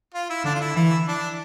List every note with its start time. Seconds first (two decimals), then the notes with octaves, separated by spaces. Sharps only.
0.14 F4
0.30 E4
0.44 D3 D4
0.55 F4
0.61 E4
0.75 E3 E4
1.08 D4